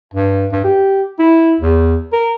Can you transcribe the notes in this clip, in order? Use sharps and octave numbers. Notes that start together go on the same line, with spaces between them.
G2
G2
G4
E4
E2
A#4